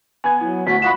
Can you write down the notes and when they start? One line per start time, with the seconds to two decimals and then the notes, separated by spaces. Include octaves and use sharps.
0.24 B3 G#5 G#6
0.41 F#3 E4
0.67 D2 F#4 B6
0.82 F4 D#5 F#5 B5 C#6 E7